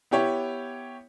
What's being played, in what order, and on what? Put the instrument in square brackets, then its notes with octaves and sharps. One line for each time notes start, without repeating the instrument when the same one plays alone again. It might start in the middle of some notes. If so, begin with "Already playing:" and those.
[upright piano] B3 E4 G4 C#5